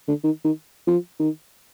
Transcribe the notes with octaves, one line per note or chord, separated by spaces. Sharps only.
D3
D#3
D#3
F3
D#3